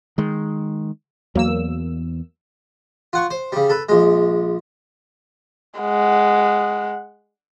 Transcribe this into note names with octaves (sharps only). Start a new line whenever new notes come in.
D#3 G#3
E2 F#3 A#3 E6
F4 F#5 C#6
C5
C#3 G3
A4 B4
A#1 G#3
G#3 F#5